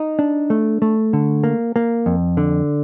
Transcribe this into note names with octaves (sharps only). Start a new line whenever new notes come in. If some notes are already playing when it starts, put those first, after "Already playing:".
Already playing: D#4
D4
A3
A3
D3
A#3
A#3
F2
D3